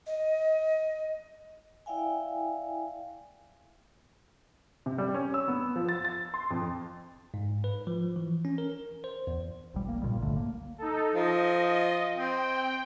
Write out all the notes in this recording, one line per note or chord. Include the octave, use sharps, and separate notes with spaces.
D#5
E4 D5 E5 F5 G5 G#5
C3
G3
C#4
E6
B3
F3
A6
A6
C6
F2
G#2
B4
F3
E3
C#4
A#4
C5
E2
E1 B1 G3
A#3
B1 A#2 C#3 G3
G1 C#2 D3 A3
A#3
D#4 A4
F3 D#5
D#5
C4 G5